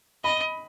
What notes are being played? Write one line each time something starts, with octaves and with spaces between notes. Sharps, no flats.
D#5 B5